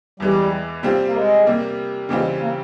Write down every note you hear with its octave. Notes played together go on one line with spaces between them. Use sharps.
E2 E3 G3 G#3
C3 G3 C4 F4
A#3
G#3
C3 G3 A#3
C#3 E3 G3 G#3 C4 F4
A#3